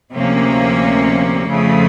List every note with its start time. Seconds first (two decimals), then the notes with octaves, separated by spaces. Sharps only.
0.14 D2 C3 F3 A#3 C#4
1.50 F2 C#3 F3 A3